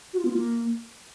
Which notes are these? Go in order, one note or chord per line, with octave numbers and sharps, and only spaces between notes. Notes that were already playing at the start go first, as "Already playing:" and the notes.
F#4
F4
B3
F4
A#3